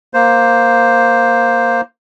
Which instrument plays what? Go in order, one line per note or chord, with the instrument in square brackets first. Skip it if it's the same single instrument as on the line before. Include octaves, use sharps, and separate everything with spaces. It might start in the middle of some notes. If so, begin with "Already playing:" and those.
[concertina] A#3 C5